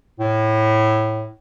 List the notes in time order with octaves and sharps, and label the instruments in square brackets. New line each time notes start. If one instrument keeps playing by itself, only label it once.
[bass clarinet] A2